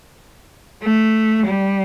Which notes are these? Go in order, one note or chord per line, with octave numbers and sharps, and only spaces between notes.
A3
G3